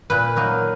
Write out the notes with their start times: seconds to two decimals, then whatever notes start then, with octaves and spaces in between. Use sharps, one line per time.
0.10 A#2 B4
0.36 F#3 A#3 D#4